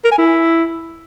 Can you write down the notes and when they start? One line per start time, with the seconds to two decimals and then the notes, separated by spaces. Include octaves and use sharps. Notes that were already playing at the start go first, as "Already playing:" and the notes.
0.05 A#4
0.12 G#5
0.18 E4